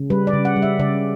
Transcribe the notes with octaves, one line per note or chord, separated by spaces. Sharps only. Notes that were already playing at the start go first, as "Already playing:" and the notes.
Already playing: C#3
G3 B4
D5
C#3
F#5
G3
E5
C#3 D5